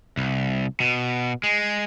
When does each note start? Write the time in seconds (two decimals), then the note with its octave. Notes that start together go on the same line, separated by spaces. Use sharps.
0.17 C2
0.80 B2
1.43 G#3